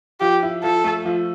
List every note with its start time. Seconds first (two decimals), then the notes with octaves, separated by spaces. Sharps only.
0.20 F3 G4
0.43 E4
0.64 F3 A4
0.84 A3
1.06 F3